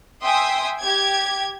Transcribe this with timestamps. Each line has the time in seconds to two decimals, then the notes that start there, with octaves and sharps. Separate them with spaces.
0.23 E5 G5 G#5 C6 D#6
0.82 G4 G#6